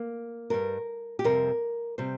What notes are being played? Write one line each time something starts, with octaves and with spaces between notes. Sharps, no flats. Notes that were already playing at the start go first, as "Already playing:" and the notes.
Already playing: A#3
G2 G3 A#4
G4
F2 C3 G3 A#4
C3 G3 C5